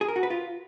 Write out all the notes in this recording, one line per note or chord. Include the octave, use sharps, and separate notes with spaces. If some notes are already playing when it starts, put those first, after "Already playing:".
G#4
A#4
F#4
B4
F4